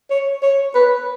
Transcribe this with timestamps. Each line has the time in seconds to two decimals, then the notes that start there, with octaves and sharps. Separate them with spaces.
0.10 C#5
0.43 C#5
0.75 B4